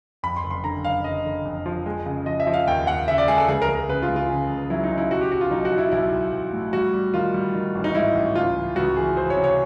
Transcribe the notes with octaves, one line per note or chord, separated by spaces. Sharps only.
F2 B5
C6
F#1
C6
D3 A#5
F#1 F5
F#1 D#5
D3
F2
F3
G#3
C#3
F3 D#5
E5
F3
F5
D#2 G5
D#2 F#5
C#3 E5
D5
G#3 G#4
A4
C#2 G#4
A#4
C#2
A#4
C#3 B4
F4
C#2
F4
C#3
C#2
F#3 E4
D#4
C#3
E4
B1 F#4
G4
B1 F#4
F4
B1 D#4
F#4
B1
E4
B1 E4
B1
B1
A2
G3 F#4
G3
D#3 F4
G3
D#3
A1
D#4
G#2 E4
A1
C#2 F4
E3
C#2 F#4
E3 G#4
E3 C5
C#5
C3
C#5